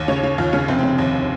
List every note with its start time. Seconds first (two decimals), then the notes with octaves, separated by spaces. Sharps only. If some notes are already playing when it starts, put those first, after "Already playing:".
Already playing: D#2
0.08 C#3 C#5
0.23 C#3
0.38 D#2 F4
0.53 C#3 C#4
0.68 F1 C4
0.79 C4
0.83 C#3
0.99 D#2